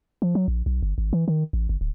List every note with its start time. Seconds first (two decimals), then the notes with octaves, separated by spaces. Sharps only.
0.22 F3
0.35 F#3
0.48 A#1
0.66 B1
0.83 G1
0.98 G#1
1.13 E3
1.28 D#3
1.53 A1
1.69 G1
1.81 D1